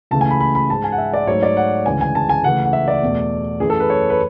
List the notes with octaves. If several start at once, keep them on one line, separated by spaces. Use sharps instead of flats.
C#2 C#3 E3 A3 A5
G#5
B5
B5
B5
G#2 G#3 A5
G#5
F#5
E5
D5
G#2 F#3 A3 C#5
D5
F#5
D2 C#3 E3 G#3 G#5
G#5
A5
G#5
C#2 C#3 E3 A3 F#5
F#5
E5
D5
E2 B2 A3
F#2 E3 A3 G#4
A4
B4
C#5
B4